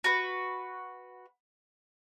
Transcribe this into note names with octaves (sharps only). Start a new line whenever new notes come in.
F#4 B4